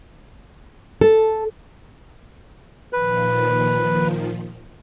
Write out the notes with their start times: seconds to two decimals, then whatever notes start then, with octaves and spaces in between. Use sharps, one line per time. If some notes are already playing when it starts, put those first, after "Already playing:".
1.01 A4
2.93 A#2 D#3 F3 B4